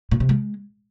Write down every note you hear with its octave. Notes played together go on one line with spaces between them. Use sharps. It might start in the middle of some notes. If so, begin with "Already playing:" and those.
A#2
C3
G#3